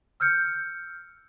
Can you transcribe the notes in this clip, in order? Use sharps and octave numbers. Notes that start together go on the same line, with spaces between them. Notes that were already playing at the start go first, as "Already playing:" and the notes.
E6 F6 G6 C#7